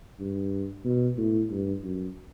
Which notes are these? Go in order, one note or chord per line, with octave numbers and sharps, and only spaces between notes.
G2
B2
A2
G2
F#2